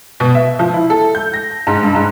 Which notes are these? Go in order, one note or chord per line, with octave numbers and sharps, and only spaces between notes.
B2
E5
F3
E4
A4
G6
A#6
G#2
G2
G#2